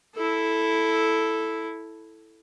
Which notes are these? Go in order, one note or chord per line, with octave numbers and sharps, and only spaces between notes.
E4 A4